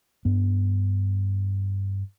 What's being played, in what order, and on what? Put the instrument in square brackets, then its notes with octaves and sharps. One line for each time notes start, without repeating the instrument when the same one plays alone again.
[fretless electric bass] G2 B3